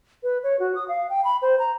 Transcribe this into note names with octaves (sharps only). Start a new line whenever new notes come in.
B4
C#5
F#4
D#6
F5
G5
B5
C5
A#5